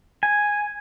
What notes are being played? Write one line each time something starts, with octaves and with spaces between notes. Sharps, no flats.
G#5